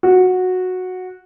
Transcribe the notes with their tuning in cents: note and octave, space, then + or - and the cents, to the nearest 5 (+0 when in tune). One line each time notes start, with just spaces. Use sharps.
F#4 -10